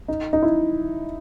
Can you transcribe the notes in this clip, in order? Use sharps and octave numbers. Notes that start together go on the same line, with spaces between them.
D#4
D#4
E4